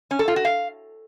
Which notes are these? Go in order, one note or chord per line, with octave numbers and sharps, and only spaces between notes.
C#4
A4
F4
F#4
F5